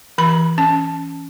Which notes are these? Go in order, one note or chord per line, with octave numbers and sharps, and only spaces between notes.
E3 B5
C#4 A5